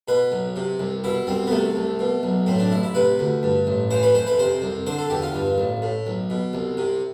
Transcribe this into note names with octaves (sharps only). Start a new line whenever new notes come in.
B2 B4
B1
C3
C2
B2 E4
C2 C4
B3
C3 A3
C2
B2
B1
A2 C4
D4
A1 E4
E4
C3 B4
D2
G2
A1
E3 C5
B4
F2 C5
B4
C3 C5
C2
D3 C5
A4
E2 G4
F4
G2
A1
A2
B1
B2
C2
C3